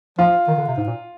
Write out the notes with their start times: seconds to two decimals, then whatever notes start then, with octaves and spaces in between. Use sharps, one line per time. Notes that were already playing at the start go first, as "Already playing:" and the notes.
0.19 F3 F4
0.48 D#3
0.58 D3
0.67 C3
0.77 G#2
0.87 A#2